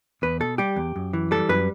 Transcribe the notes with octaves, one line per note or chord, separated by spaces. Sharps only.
E2 B4
B2 A4
G3 G4
E2
F#2
E3
G3 A4
F#2 B4